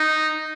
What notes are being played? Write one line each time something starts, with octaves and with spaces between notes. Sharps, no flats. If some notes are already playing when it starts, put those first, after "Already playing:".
Already playing: D#4